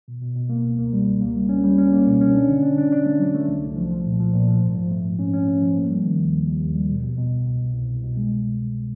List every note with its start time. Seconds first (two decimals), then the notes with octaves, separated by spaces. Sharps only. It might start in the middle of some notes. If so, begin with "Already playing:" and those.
0.08 B2
0.22 B2
0.35 B2
0.50 A#3
0.64 C#2
0.79 A#3
0.93 G3
1.07 C#2
1.21 A#3
1.36 G3
1.49 C#4
1.64 G3
1.78 C#4
1.93 A#3
2.06 B2
2.21 C#4
2.35 D4
2.49 D3
2.63 D4
2.78 D4
2.92 D4
3.06 A3
3.20 F#3
3.35 A3
3.49 C2
3.63 C2
3.76 F3
3.91 F3
4.05 A#2
4.20 F3
4.34 A#2
4.48 F3
4.62 G#2
4.76 F3
4.91 A3
5.05 G#2
5.19 C#4
5.33 C#4
5.48 A3
5.61 F3
5.76 A#3
5.90 G3
6.05 D#3
6.19 D#2
6.32 D#2
6.47 D#2
6.61 D#2
6.75 G3
6.89 B2
7.03 B2
7.18 B2
7.31 C2
7.46 B2
7.60 C2
7.75 C2
7.89 C2
8.03 B2
8.17 G#3